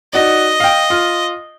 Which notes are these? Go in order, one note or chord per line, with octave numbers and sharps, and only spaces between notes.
D#4 F#4 D5 D#5
F5 G5
F4